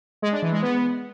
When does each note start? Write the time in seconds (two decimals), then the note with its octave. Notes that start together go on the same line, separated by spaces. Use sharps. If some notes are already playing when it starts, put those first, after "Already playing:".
0.22 G#3
0.32 D4
0.42 E3
0.52 G#3
0.62 B3